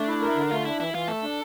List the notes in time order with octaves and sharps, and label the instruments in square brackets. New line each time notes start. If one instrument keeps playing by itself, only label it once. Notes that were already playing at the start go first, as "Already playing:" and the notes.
Already playing: [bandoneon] A3 [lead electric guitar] D4
[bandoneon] E4
A#4
D3
[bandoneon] A3 [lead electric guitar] F4
[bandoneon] D4 [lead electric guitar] E4
[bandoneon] E3 [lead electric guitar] E4
[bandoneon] E3 [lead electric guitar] F4
[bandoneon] A3 [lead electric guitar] A4
[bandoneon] D4